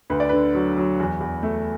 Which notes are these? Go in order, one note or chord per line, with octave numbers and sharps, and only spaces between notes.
D2 B4
D5
D3 B4
F#3
F#3
E2
E2
A3